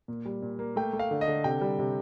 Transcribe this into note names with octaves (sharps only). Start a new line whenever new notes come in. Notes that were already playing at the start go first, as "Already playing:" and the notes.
A#2
G3
A#2
A#3
A3 G5
A3
F5
D3
D#5
D3
C3 G5
G3
C3